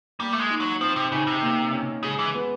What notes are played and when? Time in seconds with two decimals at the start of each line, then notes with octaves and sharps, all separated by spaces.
0.20 G3 A#3
0.33 A3
0.39 G#3
0.50 D#4
0.60 F#3
0.80 F3 C4
0.96 C3
1.11 C#3 D#4
1.27 C3
1.42 A#3
1.72 C#4
2.03 C#3 G#3
2.19 E3
2.34 B3